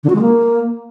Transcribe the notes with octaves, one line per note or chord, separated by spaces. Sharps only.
D3
F#4
G#3
A#3